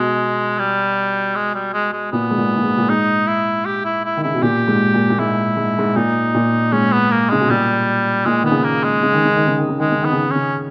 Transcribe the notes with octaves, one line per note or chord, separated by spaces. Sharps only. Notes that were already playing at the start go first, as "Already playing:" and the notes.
Already playing: B2 G#3
G3
G#3
G3
G#3
G#3
A#2 B3
G#2
A#2
A#2
G#2
A#2
G#2 D#4
E4
G4
E4
E4
D#3
C#3 E4
B2
A#2 G4
G#2
A#2
A#2
G#2 E4
G#2
G#2
A#2 D#4
A#2
G#2 C#4
B3
A#3
C#3 G#3
B2
A#2 G3
A#2 G#3
D#3 B3
C#3
A#3
G#3
C#3
D#3
C#3
D#3
C#3
D#3
C#3
D#3 G#3
C#3
D#3 B3
C#3
D#3
C#3 C#4